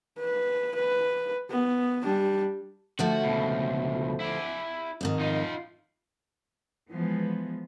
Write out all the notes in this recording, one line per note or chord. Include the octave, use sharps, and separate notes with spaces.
B4
B4
B3
G3 D4
D3 F3 A3 F#4
C#2 B2
E4 D5
F2 G#2 D#3
D#4 F4
E3 F3 G#3 B3